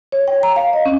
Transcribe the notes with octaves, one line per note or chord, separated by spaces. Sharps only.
C#5
G5
A#5
F5
D#5
C#4